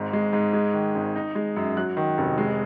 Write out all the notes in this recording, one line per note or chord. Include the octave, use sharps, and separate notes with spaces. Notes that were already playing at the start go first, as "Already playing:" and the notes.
Already playing: G#1 G#2
G#3
G#2
G#3
D#3
G#1
D#4
G#3
F#2
F#3 F#6
D#3
F1
G#3